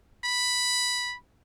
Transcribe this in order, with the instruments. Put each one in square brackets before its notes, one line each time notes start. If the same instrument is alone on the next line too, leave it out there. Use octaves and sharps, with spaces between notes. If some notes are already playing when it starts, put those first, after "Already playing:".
[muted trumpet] B5